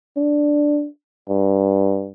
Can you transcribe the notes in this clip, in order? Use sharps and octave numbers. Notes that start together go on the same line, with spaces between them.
D4
G2